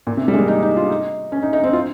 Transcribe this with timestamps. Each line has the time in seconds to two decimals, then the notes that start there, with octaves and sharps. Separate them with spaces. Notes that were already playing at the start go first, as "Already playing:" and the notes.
0.07 A#2
0.17 C3
0.28 G3
0.34 G#3
0.38 A#3
0.48 D#4
0.63 D#4
0.77 F4
0.90 D#4
1.32 C#4
1.43 D#4
1.53 D#4
1.64 C4
1.73 F4